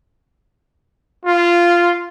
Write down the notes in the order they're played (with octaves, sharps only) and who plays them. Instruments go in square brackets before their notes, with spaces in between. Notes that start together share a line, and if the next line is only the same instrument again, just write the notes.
[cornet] F4